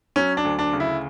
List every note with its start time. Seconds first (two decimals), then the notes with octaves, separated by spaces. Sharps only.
0.16 F#3 C#4
0.37 D4
0.45 D2
0.59 D4
0.73 C#3
0.80 E4